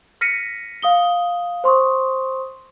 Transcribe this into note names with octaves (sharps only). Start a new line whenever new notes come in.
F6 A#6 B6 C#7 D#7
F5 D#6 G7
C5 C6 C#6 D#6